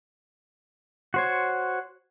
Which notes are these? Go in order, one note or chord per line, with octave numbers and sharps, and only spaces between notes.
F#4 C5 C#5